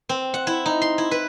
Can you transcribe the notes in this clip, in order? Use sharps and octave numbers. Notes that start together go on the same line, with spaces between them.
C4
F#5
E4
D#4
C6
E4
B4